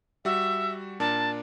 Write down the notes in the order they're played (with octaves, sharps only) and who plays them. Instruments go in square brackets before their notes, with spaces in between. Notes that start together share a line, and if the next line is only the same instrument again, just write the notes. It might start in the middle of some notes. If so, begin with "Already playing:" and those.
[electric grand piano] G3 F#4 [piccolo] E5
[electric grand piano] A#2 D4 A#4 [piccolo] A5